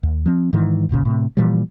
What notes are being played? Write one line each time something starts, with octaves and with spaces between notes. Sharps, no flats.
D#2
F3 C4
G#2 D#3 E3
D1 G1 A#2 C#3
A2 C3
A#2 E3 F3 G3